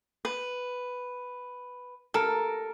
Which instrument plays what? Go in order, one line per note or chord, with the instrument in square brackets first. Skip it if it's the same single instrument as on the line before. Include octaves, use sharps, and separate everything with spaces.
[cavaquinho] B4
[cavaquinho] A4 [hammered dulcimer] A#4